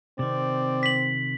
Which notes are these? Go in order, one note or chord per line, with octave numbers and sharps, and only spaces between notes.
C3 D#3 C4 D5
B6 F#7